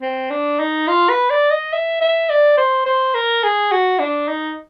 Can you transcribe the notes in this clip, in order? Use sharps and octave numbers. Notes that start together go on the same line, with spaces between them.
C4
D4
D#4
F4
B4
D5
D#5
E5
E5
D5
C5
C5
A#4
G#4
F#4
D4
D#4